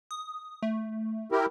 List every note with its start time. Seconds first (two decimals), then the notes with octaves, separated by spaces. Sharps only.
0.11 D#6
0.63 A3
1.32 E4 G4 A#4